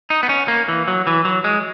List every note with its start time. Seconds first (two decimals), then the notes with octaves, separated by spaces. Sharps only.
0.10 D#4
0.23 B3
0.29 C#4
0.48 A#3
0.68 E3
0.88 F#3
1.07 E3
1.25 F#3
1.44 G#3